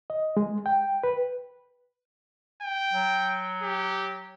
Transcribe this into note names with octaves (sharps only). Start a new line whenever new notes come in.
D#5
G#3
G5
B4
G5
F#3
G4